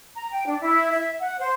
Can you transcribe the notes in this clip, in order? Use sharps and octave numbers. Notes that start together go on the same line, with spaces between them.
A#5
G5
D4
E4
E5
F#5
C5